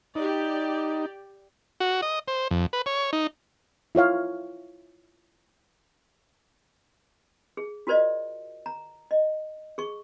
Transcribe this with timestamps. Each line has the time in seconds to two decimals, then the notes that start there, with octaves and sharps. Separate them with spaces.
0.15 D#4 G4 D5
1.80 F#4
2.02 D#5
2.28 C5
2.51 F2
2.73 B4
2.86 C#5
3.13 D#4
3.95 E4 F4 C#5 F5
7.57 G#4
7.87 F4 F#4 A#4 C5 D5 D#5
8.66 A#5
9.11 D#5
9.78 G#4 C#6